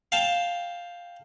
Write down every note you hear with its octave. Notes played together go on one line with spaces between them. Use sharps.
F5 G5 A5